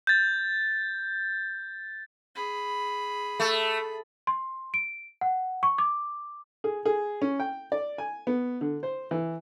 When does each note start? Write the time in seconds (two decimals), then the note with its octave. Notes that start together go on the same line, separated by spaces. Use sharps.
0.07 G6 A6
2.35 G#4 B5
3.40 A3
4.27 C6
4.74 D7
5.21 F#5
5.63 C#6
5.78 D6
6.64 G#4
6.85 G#4
7.22 C#4
7.40 G5
7.72 D5
7.98 G#5
8.27 B3
8.61 D3
8.83 C5
9.11 E3